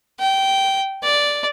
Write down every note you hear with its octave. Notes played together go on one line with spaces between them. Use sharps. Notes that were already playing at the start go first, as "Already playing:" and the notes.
G5
D5